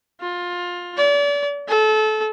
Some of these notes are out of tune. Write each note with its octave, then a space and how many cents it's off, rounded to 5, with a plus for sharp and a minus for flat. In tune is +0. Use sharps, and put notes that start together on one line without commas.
F4 +20
D5 -35
A4 -25